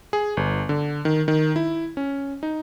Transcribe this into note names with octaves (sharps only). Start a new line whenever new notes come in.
G#4
G1
D3
D#3
D#3
E4
C#4
D#4